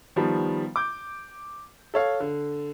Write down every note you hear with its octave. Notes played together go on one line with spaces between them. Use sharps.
D#3 F3 G3 B3
D6 G6
A4 C#5 F5
D3